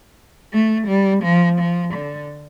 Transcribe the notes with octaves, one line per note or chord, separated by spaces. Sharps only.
A3
G3
F3
F3
D3